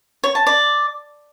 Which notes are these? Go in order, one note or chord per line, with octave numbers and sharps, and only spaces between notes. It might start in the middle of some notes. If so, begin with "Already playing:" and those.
C#5
A5
D5